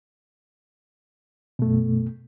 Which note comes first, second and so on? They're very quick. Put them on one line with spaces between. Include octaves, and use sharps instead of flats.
B2 A3 F#2